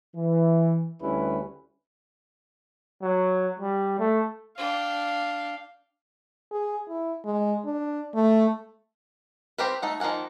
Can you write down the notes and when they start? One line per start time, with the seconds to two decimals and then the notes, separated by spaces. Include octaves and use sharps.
0.15 E3
1.02 D2 G3 C#4 E4 B4
3.02 F#3
3.60 G3
3.99 A3
4.58 D4 F5 G5
6.51 G#4
6.89 E4
7.25 G#3
7.65 D4
8.15 A3
9.58 C4 G4 A#4 B4
9.82 A3 D#4 F#5
10.00 D#3 F3 A#3 F#5 G#5